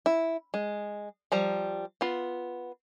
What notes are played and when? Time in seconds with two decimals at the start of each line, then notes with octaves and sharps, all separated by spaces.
0.06 E4
0.54 G#3
1.32 F3 G3 A#5
2.01 B3 F4